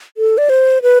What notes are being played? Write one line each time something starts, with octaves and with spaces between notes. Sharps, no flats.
A4
D5
C5
B4